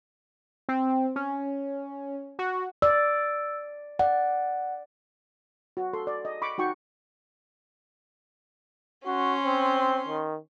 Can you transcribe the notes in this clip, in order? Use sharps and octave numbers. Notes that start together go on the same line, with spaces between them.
C4
C#4
F#4
D5 E6
D5 F#5
F#4
A4 C6
D5
D#5
B5 C#6 D6
D#4 F#4 G5 C#6
C#4 F#4 C6
C4
D#3